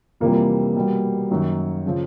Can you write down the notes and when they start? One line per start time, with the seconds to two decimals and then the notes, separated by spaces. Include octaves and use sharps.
0.20 F2 C3 E3 G3 A#3
0.76 B2 G3
1.30 F#2 D#3 F#3
1.86 C#3 F3